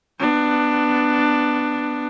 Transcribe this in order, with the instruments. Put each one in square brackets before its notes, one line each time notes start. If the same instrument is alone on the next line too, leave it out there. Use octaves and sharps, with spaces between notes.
[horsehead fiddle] B3 D4